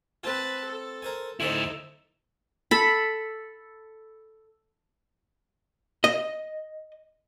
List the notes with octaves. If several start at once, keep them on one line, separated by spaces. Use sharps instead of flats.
C4 F4 B4 A5
A4
A#4 C5 G#5
D2 D#4 E4 A4 C5 E5 G#5
A4 B5
D#5